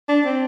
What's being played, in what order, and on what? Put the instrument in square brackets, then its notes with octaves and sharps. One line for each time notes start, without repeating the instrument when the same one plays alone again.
[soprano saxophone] D4
C4